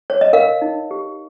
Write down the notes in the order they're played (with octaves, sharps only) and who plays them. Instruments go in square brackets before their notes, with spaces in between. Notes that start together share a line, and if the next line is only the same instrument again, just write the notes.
[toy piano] C#5
D#5
A#4 F5
D#4
G4